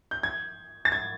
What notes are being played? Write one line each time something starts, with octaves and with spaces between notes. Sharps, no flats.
G6
G#6
A6
G#6